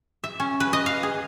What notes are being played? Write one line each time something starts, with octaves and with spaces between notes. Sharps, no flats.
E5
C#4
B4
D#5
F5
G#4